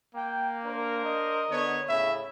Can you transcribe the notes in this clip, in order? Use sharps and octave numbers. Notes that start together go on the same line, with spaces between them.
A#3 G5
D4 A#4 C5
D#5
D3 B3 C#5
A2 C#3 E4 E5